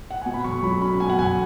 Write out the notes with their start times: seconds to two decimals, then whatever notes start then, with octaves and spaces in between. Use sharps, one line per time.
0.11 F#5
0.22 B2 G#5
0.34 B5
0.44 B1 C#6
0.63 F#3 B5
0.81 C#4 B5
1.00 B2 G#5
1.10 F#5
1.18 B1 G#5